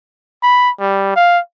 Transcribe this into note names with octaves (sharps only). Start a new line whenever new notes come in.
B5
G3
F5